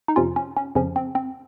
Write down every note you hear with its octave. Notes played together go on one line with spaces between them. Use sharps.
D#4
F2 C3 F3 C#4 F4
C#4
C#4
F2 C#3 F3 C#4
C4
C4